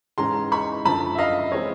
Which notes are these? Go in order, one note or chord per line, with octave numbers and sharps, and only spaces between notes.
G#2 E3 G#3 C#4 A#5 C6
B5 C#6
F#2 D3 F3 A5 B5
E5
D#5 F5
E3 G#3 C4 C#5 D#5